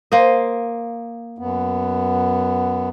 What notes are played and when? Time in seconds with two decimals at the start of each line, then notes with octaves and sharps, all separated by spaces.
0.12 A#3 C5 D#5
1.38 F#2 B3